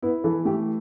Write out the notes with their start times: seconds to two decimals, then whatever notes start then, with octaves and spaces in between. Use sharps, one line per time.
0.02 B3 E4
0.24 E3 A4
0.45 A3 G4